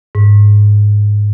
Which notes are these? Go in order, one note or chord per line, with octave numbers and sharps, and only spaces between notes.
G#2